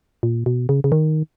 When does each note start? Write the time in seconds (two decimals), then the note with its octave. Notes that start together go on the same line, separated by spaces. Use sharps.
0.23 A#2
0.46 B2
0.69 C#3
0.84 C#3
0.92 D#3